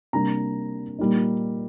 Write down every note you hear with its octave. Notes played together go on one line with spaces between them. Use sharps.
C3 G3 A#3 D4 A#5
A#2 G3 A#3 D#4